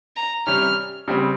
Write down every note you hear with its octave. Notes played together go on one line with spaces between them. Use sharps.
A#5
C3 G3 C#4 F6
C#3 G3 C4